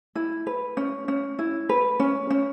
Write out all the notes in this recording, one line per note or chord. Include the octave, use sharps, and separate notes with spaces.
E4
B4
C#4
C#4
E4
B4
C#4
C#4